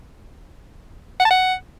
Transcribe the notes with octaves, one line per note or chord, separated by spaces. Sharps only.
F#5
A5
F#5